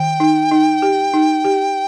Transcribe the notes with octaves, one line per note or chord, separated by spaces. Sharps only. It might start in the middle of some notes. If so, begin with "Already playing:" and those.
Already playing: D#3 G5
D#4
D#4
G4
D#4
G4